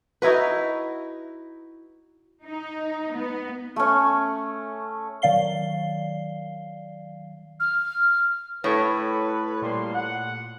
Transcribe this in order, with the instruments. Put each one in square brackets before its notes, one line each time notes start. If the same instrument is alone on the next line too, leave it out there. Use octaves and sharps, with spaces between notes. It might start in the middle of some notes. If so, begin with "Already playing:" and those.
[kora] D#4 E4 F#4 B4
[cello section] D#4
B3
[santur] A3 C#4
[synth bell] D#3 F#3 D5 F5 C7 G7
[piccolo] F6
[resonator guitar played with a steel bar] A2 [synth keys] A4 C#5 [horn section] B4
[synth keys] A#2 [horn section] G3 A#3 C6
[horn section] F#5